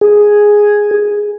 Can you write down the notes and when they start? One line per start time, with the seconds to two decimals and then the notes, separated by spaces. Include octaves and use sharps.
0.01 G#4